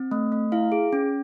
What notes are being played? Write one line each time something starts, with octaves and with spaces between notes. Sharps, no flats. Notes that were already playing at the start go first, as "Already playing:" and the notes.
Already playing: C4
A3
A3
E4 F5
G#4
C#4